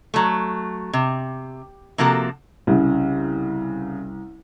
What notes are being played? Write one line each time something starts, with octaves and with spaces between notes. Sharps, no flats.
F#3 A3
C3
C3 F3 A#3 F#4 A4
C2 C#3